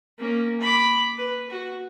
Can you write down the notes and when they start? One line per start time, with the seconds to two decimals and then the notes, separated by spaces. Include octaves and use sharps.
0.18 A#3 C#4
0.60 B5 D6
1.18 B4
1.50 F#4